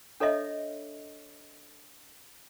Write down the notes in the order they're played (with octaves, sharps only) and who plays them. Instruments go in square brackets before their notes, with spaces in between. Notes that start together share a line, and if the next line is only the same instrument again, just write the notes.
[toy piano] D4 A4 C#5 D#5 E5